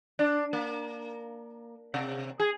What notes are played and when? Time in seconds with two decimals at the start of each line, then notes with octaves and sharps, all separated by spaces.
0.19 D4
0.53 A#3
1.94 C3
2.40 G#4